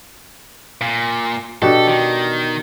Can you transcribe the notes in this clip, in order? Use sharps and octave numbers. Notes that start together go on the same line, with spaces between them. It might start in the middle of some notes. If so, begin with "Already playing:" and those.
A#2
B2 D4 G4 A4
D#3